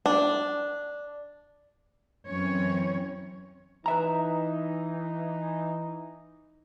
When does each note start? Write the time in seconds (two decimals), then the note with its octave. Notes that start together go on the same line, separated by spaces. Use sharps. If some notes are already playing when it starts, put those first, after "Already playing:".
0.06 D4
2.29 F#2 E3 C4 C#4 C#5
3.86 E3 D#4 B4 E5 A#5